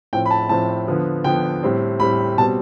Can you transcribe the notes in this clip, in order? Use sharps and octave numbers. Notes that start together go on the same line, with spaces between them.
A2 F3 C4 G5
B5
A5
A2 F3 C4 A5
D3 F3 B3
D3 F3 B3 G5
A2 G3 C4
A2 G3 C4 B5
B2 G3 C4 A5